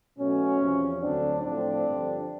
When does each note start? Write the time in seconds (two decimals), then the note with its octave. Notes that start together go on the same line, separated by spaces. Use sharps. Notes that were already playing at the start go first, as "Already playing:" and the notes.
0.18 B2 F#3 A3 C#4
0.61 E2 C3 F3
1.01 D2 D3 F#3 C4 D4
1.43 A2 F3 A3 C4 D4
1.85 G2 D3 F3